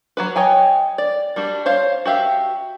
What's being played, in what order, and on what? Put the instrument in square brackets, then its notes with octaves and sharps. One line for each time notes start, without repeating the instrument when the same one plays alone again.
[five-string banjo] F#3 F#4 B4
C#5 D#5 G5 G#5
D5
G3 D4 F#4
C5 C#5 F5
F#4 G4 E5 F5